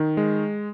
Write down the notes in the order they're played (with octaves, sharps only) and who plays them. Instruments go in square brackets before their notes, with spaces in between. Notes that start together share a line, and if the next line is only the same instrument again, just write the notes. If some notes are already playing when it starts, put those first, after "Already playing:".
Already playing: [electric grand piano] D#3
G#3